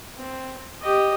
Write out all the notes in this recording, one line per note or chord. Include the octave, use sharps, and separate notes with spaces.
C4
G4 D#5